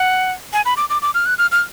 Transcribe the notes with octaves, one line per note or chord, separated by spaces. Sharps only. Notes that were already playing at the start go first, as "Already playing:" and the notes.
Already playing: F#5
G#5
B5
D6
D6
D6
F6
F#6
F6
F6